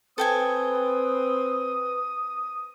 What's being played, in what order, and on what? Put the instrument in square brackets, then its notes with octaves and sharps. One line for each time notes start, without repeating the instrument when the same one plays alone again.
[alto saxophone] C4 [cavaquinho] A4 G5 G#5 [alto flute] B4 [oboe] D#6